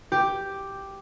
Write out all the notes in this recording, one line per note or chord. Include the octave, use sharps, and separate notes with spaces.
G4